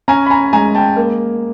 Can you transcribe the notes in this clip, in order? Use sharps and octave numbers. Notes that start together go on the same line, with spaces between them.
C#4 G#5 A#5
B5
G#5 A#5
G#3 G#5 A#5
G5 A5
A#3